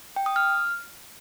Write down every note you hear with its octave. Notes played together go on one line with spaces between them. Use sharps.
G5
D#6
F6